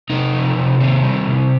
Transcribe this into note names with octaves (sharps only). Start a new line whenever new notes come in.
C3 D#4
F3
C3
D#3 C4
G3
C3